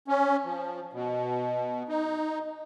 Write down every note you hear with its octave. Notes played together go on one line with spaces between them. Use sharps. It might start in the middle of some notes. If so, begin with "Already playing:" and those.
C#4
F3
B2
D#4